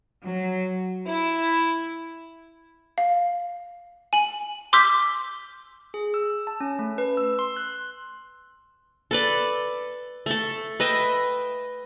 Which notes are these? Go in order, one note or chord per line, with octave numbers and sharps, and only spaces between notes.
F#3
E4
F5
G#5 F#7
C6 D6 E6 F6 G6 B6
G#4
E6
A5
C#4
A3
B4
E6
C6
F#6
A4 B4 D5
A3 A4
B4 D#5 E5 G5